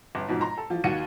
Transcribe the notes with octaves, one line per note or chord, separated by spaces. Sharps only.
G1
G#2 B2 F3
A#5 C6
A4
E3 F3 F4
D#2 F#4 F5 C#7 D#7